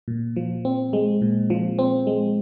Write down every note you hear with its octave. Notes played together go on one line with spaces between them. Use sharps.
A#2
F3
C4
G#3
A#2
F3
C4
G#3